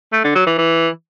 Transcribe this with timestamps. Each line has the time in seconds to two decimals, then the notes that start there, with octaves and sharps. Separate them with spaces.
0.13 A3
0.24 D3
0.35 F#3
0.47 E3
0.58 E3